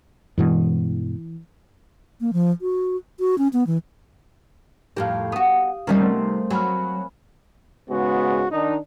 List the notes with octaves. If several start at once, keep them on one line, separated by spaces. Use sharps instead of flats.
G2 B2 E3 G#3
A#3
F3
F#4
F#4
C#4
B3
E3
F2 A2 G4 A#4 F5
B3 F#4 D#6
C3 G3 B3 C#4 D#4 A#4
A3 C4
F#3 G#5 B5 F6
G#2 C#3 G#3 B3 F#4
D#3 D4 D#4